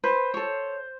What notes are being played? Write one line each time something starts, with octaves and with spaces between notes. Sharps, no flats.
B4 C5
A4 C#5